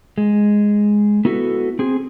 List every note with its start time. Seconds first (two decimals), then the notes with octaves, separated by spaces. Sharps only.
0.18 G#3
1.25 B3 E4 F#4 A4
1.79 C4 G#4